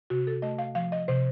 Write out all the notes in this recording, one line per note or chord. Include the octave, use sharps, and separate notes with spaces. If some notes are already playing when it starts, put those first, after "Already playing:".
C3 F#4
A4
A3 D#5
F5
F3 F5
D#5
C3 C5